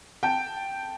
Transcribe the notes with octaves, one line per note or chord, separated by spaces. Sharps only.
G5 A5